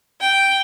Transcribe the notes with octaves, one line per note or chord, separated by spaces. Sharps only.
G5